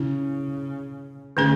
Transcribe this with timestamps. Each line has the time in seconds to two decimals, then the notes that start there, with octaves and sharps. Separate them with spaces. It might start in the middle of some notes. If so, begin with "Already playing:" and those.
Already playing: C#3 C#4 E4
1.37 D3 A3 C#4 G#4